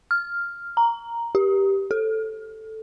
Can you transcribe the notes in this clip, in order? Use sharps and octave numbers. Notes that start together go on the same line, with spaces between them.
F6
A#5
G4
A4